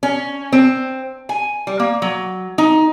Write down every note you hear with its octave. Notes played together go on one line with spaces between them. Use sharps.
C#4
C4
G#5
G3
A#3
F#3
D#4